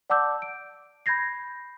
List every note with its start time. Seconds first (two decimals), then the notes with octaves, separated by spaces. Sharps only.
0.10 D5 F#5 A5 D6 E6 G6
0.42 D7
1.06 B5 G6 G#6 A#6 C7